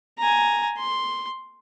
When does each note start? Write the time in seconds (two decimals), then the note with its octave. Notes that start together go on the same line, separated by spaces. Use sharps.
0.19 G#5 A#5
0.78 C6